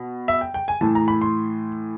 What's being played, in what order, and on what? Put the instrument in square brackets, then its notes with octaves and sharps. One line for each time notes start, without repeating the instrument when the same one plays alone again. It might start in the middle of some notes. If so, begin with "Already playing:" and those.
Already playing: [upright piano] B2
E5
G5
G5
G#5
A2 E3 A5
A#5
B5
C6